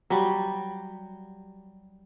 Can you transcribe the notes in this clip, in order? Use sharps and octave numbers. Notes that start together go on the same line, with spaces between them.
F#3 G3